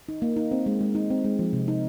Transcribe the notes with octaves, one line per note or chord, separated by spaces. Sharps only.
D#4
A#3
D#4
C4
G#3
G#3
D#4
C4
G#3
F3
C3
D#4